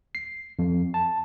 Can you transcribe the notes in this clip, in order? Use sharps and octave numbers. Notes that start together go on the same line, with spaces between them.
C7
F2
A5